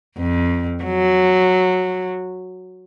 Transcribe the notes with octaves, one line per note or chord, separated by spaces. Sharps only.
F2
F#3